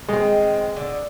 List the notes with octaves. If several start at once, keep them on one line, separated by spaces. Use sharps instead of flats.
D#3 G#3 C4
D3